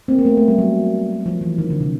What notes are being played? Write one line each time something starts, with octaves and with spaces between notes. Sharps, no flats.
A#3 C4
A#3
A3 B3
A3
G3
F#3
F3
E3
D#3
D3
C3